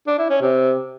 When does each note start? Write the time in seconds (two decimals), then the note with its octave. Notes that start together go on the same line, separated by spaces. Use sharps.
0.07 D4
0.19 E4
0.30 C#4
0.41 C3